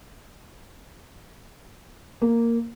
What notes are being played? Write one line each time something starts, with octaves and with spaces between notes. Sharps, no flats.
A#3